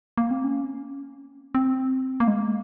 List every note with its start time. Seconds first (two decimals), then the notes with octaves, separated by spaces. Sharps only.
0.18 A#3
0.31 C4
0.44 C#4
1.55 C4
2.20 A#3
2.28 G#3